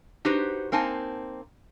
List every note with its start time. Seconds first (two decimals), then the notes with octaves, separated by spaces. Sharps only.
0.25 D#4 F#4 G4 B4 C5
0.72 A#3 C4 D#4 G#5 A5